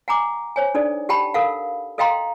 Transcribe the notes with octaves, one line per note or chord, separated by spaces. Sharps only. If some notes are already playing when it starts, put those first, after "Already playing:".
F#5 G#5 A#5 D6
C5 C#5 G#5
D4 D#4 A4 D5
G4 F#5 G5 A5 B5
A4 A#4 F5 F#5
A4 D#5 F5 G5 A#5 C6